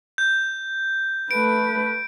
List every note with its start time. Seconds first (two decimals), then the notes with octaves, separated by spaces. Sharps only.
0.18 G6
1.31 A3 B4 D7